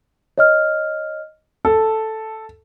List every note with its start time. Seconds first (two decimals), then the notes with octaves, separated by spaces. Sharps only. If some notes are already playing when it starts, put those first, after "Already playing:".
0.38 C#5 D#5 F6
1.65 A4 A5